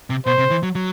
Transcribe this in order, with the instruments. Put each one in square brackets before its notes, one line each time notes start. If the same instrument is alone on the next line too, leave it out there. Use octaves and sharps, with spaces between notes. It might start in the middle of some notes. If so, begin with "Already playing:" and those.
[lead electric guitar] C3
[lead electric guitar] B2 [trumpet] C5
[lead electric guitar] C3
E3
F#3
F#3